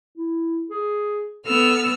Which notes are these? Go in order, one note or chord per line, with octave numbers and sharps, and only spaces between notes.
E4
G#4
B3 A4 E6 F6